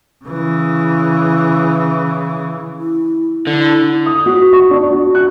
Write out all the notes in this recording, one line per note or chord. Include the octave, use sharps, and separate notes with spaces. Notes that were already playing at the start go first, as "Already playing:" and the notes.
C#3 E3
E4
D3 E4
D#6
F#4
C#6
D4
F#4
F#6